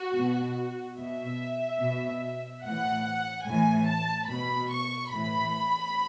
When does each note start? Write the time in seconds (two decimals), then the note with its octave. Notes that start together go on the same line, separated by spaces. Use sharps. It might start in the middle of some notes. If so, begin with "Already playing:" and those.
Already playing: F#4
0.14 B2
0.98 B2 E5
1.80 B2
2.64 A2 E3 F#5
3.46 A2 E3 G#5
3.88 A5
4.29 B2 B5
4.71 C#6
5.12 A2 E3 B5